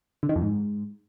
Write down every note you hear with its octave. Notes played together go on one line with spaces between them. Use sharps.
D3
D#3
F2
G#2